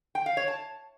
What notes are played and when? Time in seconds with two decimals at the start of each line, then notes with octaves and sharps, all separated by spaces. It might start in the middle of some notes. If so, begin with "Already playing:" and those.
0.15 G5
0.26 F5
0.37 C#5
0.48 A5